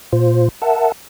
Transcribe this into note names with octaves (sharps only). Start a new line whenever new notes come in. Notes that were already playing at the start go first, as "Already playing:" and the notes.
A#2 F4 C5
A#4 E5 F#5 A5